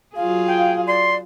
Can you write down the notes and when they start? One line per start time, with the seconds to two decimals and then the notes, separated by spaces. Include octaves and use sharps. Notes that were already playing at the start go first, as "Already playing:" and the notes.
0.16 F#3 F4 G#4 F5
0.47 G5
0.87 D5 C6